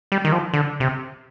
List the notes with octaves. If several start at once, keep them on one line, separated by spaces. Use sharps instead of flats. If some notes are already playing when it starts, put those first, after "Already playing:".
G3
D#3
F3
D3
C3